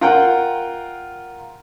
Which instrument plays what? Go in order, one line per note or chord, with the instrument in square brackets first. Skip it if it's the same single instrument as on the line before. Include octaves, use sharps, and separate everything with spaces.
[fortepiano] F4 A#4 F#5 G5